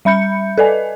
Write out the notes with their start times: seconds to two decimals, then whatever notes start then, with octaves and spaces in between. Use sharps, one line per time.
0.05 G3 E5 B5 G6 C#7
0.58 A4 B4 D5 D#5 G#5